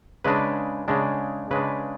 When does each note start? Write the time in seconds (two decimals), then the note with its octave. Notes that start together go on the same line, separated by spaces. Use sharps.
0.24 C#3 G#3 D4 B4
0.88 C#3 G#3 D4
1.51 C#3 G#3 D4 B4